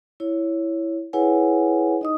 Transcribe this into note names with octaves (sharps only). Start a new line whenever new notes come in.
E4 C#5
E4 G#4 B4 C#5 F#5 G#5
D#4 D#5 D#6